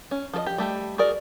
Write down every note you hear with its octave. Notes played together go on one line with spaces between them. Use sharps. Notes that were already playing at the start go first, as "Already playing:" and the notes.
C#4
F3 A4 D#5
G4
G3 A3 G4
F#4 G#4 A#4 D5